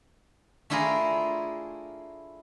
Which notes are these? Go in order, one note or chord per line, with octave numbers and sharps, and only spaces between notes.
A3 D4 E4 F4 G#4 A#4